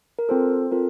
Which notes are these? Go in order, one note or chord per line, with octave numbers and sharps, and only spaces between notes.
A#4
C4 F4 A4 C5
C4 F4 A4 A#4